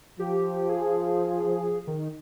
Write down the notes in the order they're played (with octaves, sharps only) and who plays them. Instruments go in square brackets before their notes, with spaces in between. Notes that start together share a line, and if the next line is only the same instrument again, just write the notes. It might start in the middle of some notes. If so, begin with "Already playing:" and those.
[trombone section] F3 [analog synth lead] G4
[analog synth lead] G#4
D#3